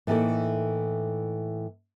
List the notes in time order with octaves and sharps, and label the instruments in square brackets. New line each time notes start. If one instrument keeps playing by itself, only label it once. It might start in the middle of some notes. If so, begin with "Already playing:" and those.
[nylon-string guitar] A2 E3 A#3 D#4 A4